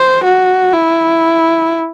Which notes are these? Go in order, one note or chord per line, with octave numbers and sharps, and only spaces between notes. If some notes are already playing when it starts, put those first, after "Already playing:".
Already playing: C5
F#4
E4